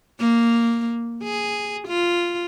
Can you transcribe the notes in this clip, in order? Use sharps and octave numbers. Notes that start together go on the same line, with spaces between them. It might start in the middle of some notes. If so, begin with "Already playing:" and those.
A#3
G#4
F4